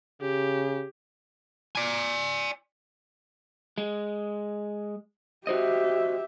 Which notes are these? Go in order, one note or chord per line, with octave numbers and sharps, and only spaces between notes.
C#3 G4
D5 G#5
G#3
F#4 G4 C5 D#5 E5